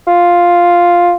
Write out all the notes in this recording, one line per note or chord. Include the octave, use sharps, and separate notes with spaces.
F4